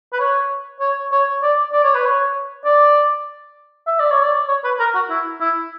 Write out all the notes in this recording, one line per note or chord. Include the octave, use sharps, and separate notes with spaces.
B4
C#5
C#5
C#5
D5
D5
C#5
B4
C#5
D5
E5
D5
C#5
D5
C#5
B4
A#4
F#4
E4
E4